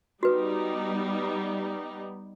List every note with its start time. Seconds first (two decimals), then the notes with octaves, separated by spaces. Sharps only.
0.23 G3 B3 D#4 F#4 B4